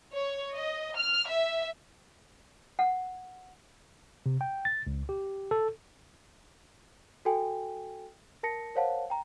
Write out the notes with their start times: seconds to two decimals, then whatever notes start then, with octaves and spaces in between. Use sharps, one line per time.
0.14 C#5
0.54 D#5
0.94 F6
1.28 E5
2.79 F#5
4.26 C3
4.41 G5
4.65 A6
4.87 C#2
5.09 G4
5.51 A4
7.25 F#4 A4 G5 G#5
8.43 A#4 A5 A#6 C#7
8.75 A#4 C5 C#5 F5 F#5 A5
9.10 G5 A#5